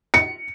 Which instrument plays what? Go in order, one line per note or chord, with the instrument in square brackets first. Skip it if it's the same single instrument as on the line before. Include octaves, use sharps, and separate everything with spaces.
[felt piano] C#7